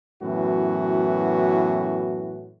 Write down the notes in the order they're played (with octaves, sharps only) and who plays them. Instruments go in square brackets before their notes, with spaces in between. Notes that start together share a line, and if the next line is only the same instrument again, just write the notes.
[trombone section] F#2 A2 E3 B3 F#4